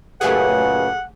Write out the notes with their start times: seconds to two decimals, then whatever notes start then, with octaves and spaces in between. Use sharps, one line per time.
0.21 F#2 A#2 C#3 A3 G4 G#4 B4 F#5